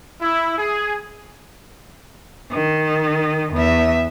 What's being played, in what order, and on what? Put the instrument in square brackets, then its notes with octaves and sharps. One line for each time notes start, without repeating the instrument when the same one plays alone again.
[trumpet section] E4
G#4
[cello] D#3
E2 E5